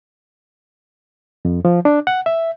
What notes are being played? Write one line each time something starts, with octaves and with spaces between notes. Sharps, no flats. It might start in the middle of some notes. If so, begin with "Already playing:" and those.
F2
F3
D4
F#5
E5